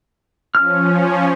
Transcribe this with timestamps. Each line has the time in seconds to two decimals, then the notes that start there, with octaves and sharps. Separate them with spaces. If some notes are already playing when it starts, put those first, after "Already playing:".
0.55 F3 C#4 F6